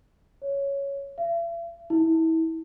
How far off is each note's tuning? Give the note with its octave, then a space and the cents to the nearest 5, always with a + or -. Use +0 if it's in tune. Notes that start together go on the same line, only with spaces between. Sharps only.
C#5 +5
E5 +45
E4 -30